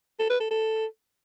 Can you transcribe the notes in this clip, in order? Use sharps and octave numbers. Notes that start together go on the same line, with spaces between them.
A4
B4
A4
A4